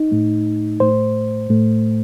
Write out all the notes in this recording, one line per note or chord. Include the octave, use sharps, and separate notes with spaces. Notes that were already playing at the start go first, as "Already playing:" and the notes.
Already playing: D#4
A2 A3
A2 A3 C5
A2 A3